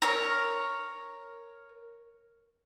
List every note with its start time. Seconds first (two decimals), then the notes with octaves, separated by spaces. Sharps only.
0.02 A#4 C#5